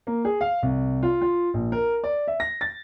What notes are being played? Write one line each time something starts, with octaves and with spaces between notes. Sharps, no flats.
A#3
G#4
F5
C2
F4
F4
A#1
A#4
D5
E5
A#6
A6